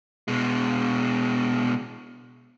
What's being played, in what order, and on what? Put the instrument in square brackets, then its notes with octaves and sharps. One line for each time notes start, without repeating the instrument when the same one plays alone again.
[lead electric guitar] B2 G#3